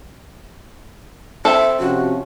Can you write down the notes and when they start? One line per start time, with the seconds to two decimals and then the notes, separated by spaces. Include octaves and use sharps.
1.45 C4 A4 E5
1.79 C3 F3 C#4 F#4